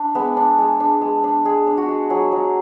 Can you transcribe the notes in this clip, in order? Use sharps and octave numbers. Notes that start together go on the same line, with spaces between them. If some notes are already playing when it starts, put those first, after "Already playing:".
Already playing: D4
G#3 B3 B4
D4
G#3
D4
G#3
D4
G#3 G#4
D4
F#4
G#3
F#3 G#4
F#3